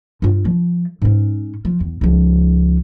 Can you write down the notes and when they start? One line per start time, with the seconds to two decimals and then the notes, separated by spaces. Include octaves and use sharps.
0.22 G2 F4
0.45 F3
1.02 G#2 C#4
1.65 F3
1.80 E2
2.01 C#2 F3